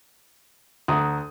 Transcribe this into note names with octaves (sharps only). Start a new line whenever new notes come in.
D2 F#5 A#5 D#6